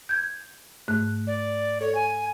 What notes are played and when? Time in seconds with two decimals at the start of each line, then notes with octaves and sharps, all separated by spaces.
0.09 G6 G#6
0.88 G#2 A3 F#6
1.27 D5
1.81 A4 C#5
1.95 G#5